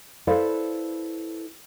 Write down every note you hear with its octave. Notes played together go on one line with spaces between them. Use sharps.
E4 A4 B4 C5 D5 F5